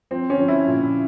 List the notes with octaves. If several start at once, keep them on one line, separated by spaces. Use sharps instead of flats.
F3 C4
C#4
F3
E4
A#2